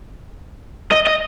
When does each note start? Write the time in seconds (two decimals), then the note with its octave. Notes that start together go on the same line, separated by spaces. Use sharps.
0.92 D#5
1.07 D#5